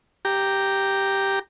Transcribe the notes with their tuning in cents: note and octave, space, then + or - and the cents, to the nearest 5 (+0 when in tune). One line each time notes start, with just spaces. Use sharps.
G4 +0 A#5 +0